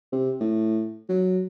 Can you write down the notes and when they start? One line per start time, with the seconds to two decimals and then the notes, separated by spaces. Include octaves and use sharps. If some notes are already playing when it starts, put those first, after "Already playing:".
0.13 C3
0.40 A2
1.09 F#3